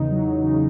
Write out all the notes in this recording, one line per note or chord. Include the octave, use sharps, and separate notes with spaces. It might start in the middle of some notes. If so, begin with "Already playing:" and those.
Already playing: E2 C#3 D#4
F#3
E2
C#3